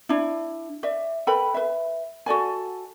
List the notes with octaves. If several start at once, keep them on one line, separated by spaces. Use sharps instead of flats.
D4 E4
D5 E5
A4 B4 G5 B5
B4 E5
F#4 A4 D5 G#5